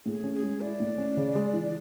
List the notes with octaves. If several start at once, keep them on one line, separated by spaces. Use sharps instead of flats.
A2 G#4
C#4
G#4
G#3
E4 D5
A2
C#4
C#3
G#3
E3